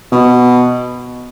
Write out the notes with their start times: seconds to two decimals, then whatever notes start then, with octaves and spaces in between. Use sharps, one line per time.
0.12 B2